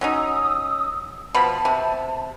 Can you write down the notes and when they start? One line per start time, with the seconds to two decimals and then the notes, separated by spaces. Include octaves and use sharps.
0.01 F#3 C#4 D#4 D#6 E6
1.35 B2 F3 A5 B5
1.65 C3